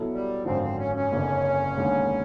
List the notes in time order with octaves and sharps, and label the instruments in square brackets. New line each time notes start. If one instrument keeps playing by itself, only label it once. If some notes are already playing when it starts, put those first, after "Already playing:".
Already playing: [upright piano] B2 F#3 B3 E4 A4
[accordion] G3
[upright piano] G#1 F#2 D3 F3 [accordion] C4
[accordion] C4
C#4
C#4
[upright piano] F#1 F2 D3
E1 D#2 D3